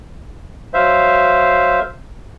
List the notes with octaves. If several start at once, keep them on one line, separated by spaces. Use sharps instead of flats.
F#3 C5 E5 F5